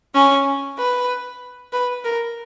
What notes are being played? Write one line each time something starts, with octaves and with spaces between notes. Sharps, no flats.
C#4
B4
B4
A#4